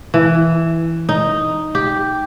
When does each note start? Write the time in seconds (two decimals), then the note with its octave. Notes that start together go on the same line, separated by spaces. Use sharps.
0.14 E3
1.09 D#4
1.75 G4